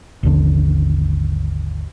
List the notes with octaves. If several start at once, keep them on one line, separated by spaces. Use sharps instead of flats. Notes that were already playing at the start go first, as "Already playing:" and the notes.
G#1 D#2 D3